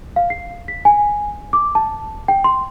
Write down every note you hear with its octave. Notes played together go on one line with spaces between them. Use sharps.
F5
C7
B6
G#5
D6
A5
G5
C6